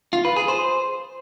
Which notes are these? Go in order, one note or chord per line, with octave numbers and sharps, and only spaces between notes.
F4
B4
G#4
C5